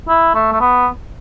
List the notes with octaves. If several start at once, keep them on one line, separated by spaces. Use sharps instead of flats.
E4
A3
A3
B3